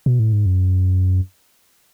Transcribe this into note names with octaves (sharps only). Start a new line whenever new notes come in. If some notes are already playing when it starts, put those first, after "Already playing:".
B2
A2
G#2
F#2